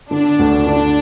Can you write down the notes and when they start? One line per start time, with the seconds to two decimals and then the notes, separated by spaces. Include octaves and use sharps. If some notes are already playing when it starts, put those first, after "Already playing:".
0.10 D3 D4
0.39 D2
0.67 D3 D4